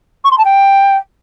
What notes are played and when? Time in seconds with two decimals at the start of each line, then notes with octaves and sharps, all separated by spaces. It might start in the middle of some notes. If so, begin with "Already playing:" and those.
0.24 C#6
0.31 C6
0.38 A5
0.45 G5